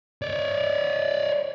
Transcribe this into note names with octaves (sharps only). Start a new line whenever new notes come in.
C#5 D5